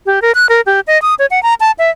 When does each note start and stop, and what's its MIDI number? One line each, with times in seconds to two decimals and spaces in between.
0.06 0.22 67
0.22 0.32 70
0.35 0.46 90
0.49 0.61 70
0.66 0.80 67
0.87 1.00 75
1.02 1.14 87
1.19 1.26 73
1.31 1.42 78
1.43 1.54 82
1.60 1.71 81
1.79 1.90 76